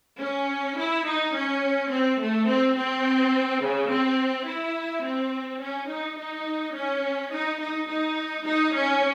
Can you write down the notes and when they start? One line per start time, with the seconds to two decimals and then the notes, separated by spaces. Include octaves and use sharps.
0.20 C#4
0.78 E4
1.06 D#4
1.34 C#4
1.91 C4
2.20 A3
2.48 C4
2.77 C4
3.62 C#3
3.90 C4
4.47 E4
5.04 C4
5.61 C#4
5.89 D#4
6.18 D#4
6.75 C#4
7.32 D#4
7.60 D#4
7.88 D#4
8.45 D#4
8.74 C#4